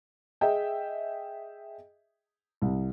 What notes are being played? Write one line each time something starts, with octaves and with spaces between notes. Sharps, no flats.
G#4 D#5 E5 G5
C2